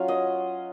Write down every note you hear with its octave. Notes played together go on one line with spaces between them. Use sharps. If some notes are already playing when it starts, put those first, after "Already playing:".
Already playing: F#3 C#4 F4 F5
D#5